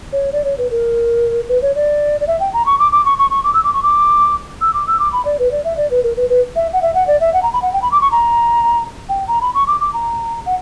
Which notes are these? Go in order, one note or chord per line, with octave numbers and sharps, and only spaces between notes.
C#5
D5
C#5
B4
A#4
B4
C#5
D5
D5
E5
G5
A#5
C#6
D6
D6
C#6
C#6
C#6
D6
E6
D6
C#6
D6
E6
D6
E6
D6
B5
D5
B4
D5
E5
D5
B4
A#4
B4
B4
E5
F#5
E5
F#5
D5
E5
F#5
A#5
B5
F#5
G5
B5
D6
C#6
A#5
G5
A#5
B5
C#6
D6
D6
A#5
F#5